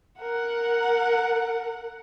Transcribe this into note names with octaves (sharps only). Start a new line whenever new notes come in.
A#4 F#5